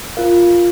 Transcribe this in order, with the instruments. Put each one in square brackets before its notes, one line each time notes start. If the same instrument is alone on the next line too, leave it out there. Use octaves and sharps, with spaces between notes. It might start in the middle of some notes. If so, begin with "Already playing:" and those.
[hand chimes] F4 A#4 F5